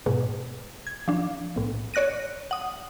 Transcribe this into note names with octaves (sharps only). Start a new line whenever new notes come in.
G#2 B2
G#6
F3 D4
B1 A2
C#5 D5 F#6 A#6 D#7
F#5 D#6